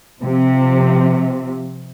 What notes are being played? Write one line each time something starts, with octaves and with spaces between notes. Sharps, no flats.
C3 F3